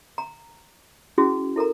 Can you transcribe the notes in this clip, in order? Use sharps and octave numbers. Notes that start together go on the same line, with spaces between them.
A#5
C#4 E4 F#4 G#4
E4 A4 A#4 A#5